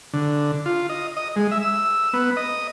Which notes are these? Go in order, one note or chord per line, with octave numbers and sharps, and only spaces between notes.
D3
F4
D#5
D#5
G#3
E5
E6
B3
D#5